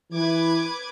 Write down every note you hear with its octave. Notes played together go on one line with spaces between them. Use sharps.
E3 B4 D6 G#6